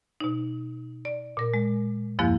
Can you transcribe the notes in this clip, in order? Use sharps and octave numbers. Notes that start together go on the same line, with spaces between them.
B2 D#4
D5
A#2 A#4
G#3
E2 G2 F3 A#3 E4 F#6